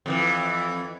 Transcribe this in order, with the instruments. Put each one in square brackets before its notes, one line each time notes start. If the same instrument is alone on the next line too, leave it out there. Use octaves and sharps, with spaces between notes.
[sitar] F2 C#3 E3